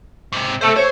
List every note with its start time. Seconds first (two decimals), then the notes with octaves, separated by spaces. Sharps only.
0.32 G#2 C3
0.61 A3 C5 E5
0.76 C5 C#5